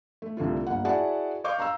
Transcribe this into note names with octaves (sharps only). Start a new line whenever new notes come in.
A3
C2 D3 A3 F4
G1 A#3 F#5
E4 F#4 G#4 D5 F#5 A5
D#5 F5 C#6 D6 G6
F5 A#5 C6 E6